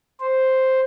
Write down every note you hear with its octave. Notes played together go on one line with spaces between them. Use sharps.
C5